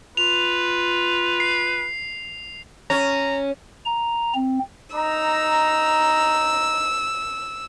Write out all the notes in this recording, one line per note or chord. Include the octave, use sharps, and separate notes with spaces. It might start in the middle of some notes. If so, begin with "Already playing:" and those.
F4 B4 F7
C7
C#4 A#5
A#5
C4
D#4 A#5 E6